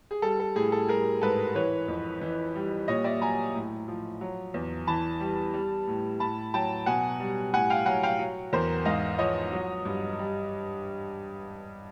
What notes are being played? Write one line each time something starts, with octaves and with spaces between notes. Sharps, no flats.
G#4
G3 A4
A4
A2 G#4
A4
G3 G#4 A#4
G#2 A4 B4
E3 B4 C#5
F2
E3
G3
A#2 C#5 D#5
D5 E5
F#3 G#5 A#5
A2
F3
F#3
E2
E3 A5 B5
G3
G3
A2
A2 A5 B5
F#3 G5 A5
B2 F#5 G#5
G3
A2 F#5 G#5
F5 G5
F#3 F#5 G#5
F5 G5
F#3
E2 A#4 C5
G#2 D#5 F5
F3 C#5 D#5
F#3
G2
G3